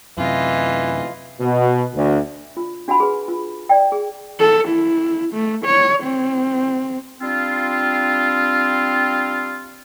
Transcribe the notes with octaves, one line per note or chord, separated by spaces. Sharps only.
F#2 C3 E3 F4 D#5
B2
D2
F4
D4 F#4 F#5 G#5 B5
G#4 B4
F4
D5 G5
G#4
A4
E4
A3
C#5
C4
G3 C4 D4 F4